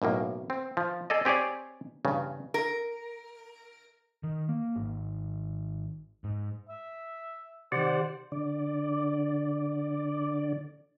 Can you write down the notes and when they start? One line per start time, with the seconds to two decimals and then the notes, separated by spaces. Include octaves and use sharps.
0.02 B1 F#2 A2 A#3
0.50 C4
0.77 F3
1.10 G#4 A4 D5 D#5
1.25 C4 G4 G#4 C#5 D5
2.05 E2 G2 C#3
2.54 A#4
4.23 D#3
4.49 A#3
4.76 G#1
6.24 G#2
6.69 E5
7.72 C3 D#3 G4 C5 D5 F#5
8.32 D3 D5